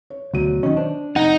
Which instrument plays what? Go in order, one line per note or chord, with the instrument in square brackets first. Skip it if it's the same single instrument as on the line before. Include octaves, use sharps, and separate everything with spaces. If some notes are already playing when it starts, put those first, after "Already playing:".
[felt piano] C#5
[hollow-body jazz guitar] D2 [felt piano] B2 F#3 D#7
[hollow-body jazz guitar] D#3 C#4 [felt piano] D#5
[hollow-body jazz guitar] D4 [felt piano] C5
[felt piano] F1 [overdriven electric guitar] D#4 [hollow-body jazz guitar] F#5